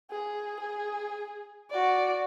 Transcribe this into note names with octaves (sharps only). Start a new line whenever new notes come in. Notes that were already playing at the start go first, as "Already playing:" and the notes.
G#4
G#4
F#4 D5